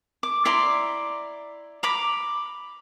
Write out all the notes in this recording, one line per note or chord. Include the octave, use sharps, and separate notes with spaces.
D6
E4 D5 A#5 C6
A#5 B5 D6